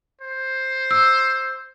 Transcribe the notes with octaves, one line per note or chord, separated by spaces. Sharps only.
C5
E6